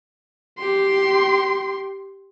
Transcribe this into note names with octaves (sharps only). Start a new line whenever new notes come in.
G4 C6